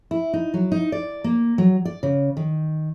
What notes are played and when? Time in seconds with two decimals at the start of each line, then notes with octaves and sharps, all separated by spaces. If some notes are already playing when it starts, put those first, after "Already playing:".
0.11 E4
0.33 D#4
0.54 F#3
0.72 D#4
0.92 D5
1.24 A#3
1.58 F#3
1.85 D5
2.03 C#3
2.37 D#3